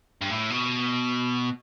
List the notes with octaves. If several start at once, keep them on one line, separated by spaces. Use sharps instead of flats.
G2
A2
B2